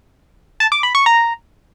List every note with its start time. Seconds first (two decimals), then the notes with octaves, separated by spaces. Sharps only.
0.60 A5
0.72 D6
0.83 B5
0.95 C#6
1.06 A#5